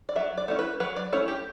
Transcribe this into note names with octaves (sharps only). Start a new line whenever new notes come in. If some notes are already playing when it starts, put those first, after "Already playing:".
D5
F#3 E5
D5
A3 C#4 E4
B4
F#3 B4
D5
A3 C#4 E4 C#5
G4